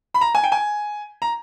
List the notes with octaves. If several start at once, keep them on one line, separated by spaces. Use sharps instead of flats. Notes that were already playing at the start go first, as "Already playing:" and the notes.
B5
A#5
G#5
G5
G#5
A#5